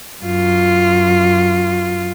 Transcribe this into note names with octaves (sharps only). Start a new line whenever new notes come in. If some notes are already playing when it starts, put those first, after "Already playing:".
F#2 F4